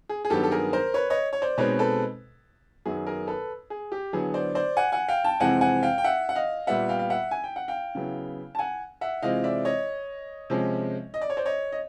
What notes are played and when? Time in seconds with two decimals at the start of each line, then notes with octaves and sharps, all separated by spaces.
0.09 G#4
0.25 G#4
0.30 G2 D#3 F#3 B3 G4 A4
0.44 A4
0.51 G#4 A#4
0.73 A#4 C5
0.94 B4 C#5
1.10 C#5 D#5
1.33 C#5
1.42 C5 D5
1.58 B2 G#3 C4 D#4 B4 C#5
1.79 A4 B4
2.85 F#2 D#3 F#3 B3 G#4
3.06 G#4 A#4
3.27 A4 B4
3.70 G#4
3.92 G4
4.13 D3 F#3 B3 E4 G#4
4.34 C5 D5
4.55 C5 D5
4.77 F#5 G#5
4.92 F#5 G#5
5.08 F5 G5
5.24 G5 A5
5.40 F2 C3 E3 G#3 C4 F#5 G#5
5.61 F#5 G#5
5.83 F5 G5
5.98 G5
6.04 E5 F#5
6.29 F#5
6.35 D#5 F5
6.67 A#2 G3 B3 E5 F#5
6.89 F5 G5
6.99 F5
7.10 E5 F#5
7.31 G#5
7.44 G5
7.56 F#5
7.68 F5 G5
7.95 C#3 F#3 B3 E4
8.55 A5
8.59 F#5 G#5
9.01 E5 F#5
9.23 C3 E3 G#3 C4 F4 D#5 F5
9.44 D5 E5
9.65 C#5 D#5
10.50 C3 F3 G#3 C#4
11.14 D#5
11.22 D5
11.30 C#5
11.37 C5 D5
11.46 C#5 D#5
11.72 D#5